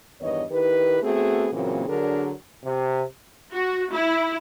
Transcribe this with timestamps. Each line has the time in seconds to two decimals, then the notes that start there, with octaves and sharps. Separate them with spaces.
0.21 E2 G2 D#3 B3 C#5 D#5
0.51 D#3 E4 G4 B4
1.03 A3 B3 C4 F#4 G#4
1.53 A#2 C#3 E3 F#3 A#3 C4
1.88 D3 F#3 D4 G#4 A#4
2.64 C3
3.52 F#4
3.91 E4